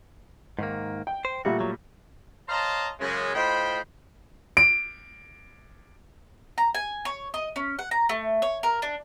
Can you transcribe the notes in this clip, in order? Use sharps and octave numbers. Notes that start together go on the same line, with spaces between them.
G#2 D#3 A#3
G5
C5
A#2 G3 A3 F#4
F#3
C5 C#5 D#5 F5 A5 A#5
F#2 C#3 G#3
A2 F4 C5 D#5 G5 B5
D7
A#5
G#5
C#5
D#5
C#4
F#5
A#5
A3
C#5
A#4
D4